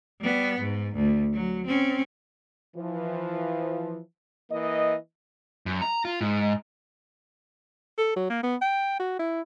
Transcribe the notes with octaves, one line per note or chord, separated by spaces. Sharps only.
G3 B3
G#2
D2
F#3
C4 C#4
E3 F3
E3 A#3 D#5
F#2
A#5
F4
G#2
A4
F#3
A#3
B3
G5
F#4
E4